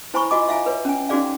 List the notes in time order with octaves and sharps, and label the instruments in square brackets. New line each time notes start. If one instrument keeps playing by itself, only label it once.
[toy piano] E4 C5 G#5 A#5 B5 C#6
F4 F#4 D#5 G#5 D6
E5 F5 G#5 A#5
B4 C#5
C#4 G#5
C#4 D#4 F#4 G#4 D5 F5